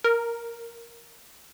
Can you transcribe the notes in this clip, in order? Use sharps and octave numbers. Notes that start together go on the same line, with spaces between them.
A#4